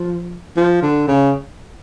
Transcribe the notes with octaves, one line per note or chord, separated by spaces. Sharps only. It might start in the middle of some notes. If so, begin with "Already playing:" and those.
Already playing: F3
F3
D3
C#3